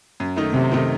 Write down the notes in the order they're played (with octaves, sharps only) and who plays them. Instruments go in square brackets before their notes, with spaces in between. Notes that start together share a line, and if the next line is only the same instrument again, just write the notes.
[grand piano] F#2
D#3 A3 D#4
[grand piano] F#2 [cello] C3
[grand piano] D#3 A3 D#4